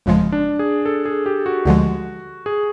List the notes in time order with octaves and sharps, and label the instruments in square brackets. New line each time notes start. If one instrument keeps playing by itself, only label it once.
[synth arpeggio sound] G1 F2 C#3 F3 G#3
[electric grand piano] D4
G#4
A4
G#4
G4
F#4
[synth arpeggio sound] D2 D3 F3 G#3
[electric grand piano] G#4